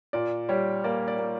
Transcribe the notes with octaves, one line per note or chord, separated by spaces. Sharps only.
A#2 D5
G3 C#5
A#3 D5
D5
A#3